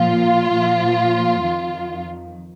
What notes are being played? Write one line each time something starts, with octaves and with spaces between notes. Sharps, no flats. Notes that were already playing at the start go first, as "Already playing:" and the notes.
Already playing: A#2 F3 F4
A#2 F3
F2 D#3